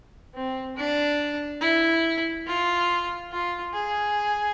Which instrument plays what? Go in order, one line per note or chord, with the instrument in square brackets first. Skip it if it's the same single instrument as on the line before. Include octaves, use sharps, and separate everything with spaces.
[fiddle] C4
D4
E4
F4
F4
G#4